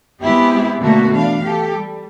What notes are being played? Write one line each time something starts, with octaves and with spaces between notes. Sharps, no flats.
G#3 B3 C4 E4 G4 G#4
B2 D3 A3 A#3 F#4
E3 D4 F5
G4 A4
G3